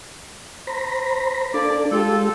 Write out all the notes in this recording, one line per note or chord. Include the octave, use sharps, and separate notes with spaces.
C5 A#5 B5
A#3 D4 A4 D5
G#3 F4 G4 A4